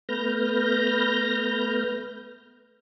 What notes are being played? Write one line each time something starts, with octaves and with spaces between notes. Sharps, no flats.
A3 B3 B4 F6 G6 A#6